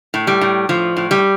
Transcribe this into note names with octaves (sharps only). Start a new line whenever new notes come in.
A2
G3
A2
A2 F3
A2
G3